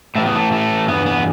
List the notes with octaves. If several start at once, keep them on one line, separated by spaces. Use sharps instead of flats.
A2 E3 A3
B3
A3
A3
G2 E3 B3
B3